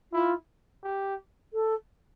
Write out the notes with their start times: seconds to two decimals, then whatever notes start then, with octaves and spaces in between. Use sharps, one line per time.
0.13 E4 F4
0.83 G4
1.53 A4